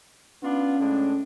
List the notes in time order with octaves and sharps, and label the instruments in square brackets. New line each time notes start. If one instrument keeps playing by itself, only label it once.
[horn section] B3 D4 F4 [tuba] C#4
[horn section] A2 G#3 D4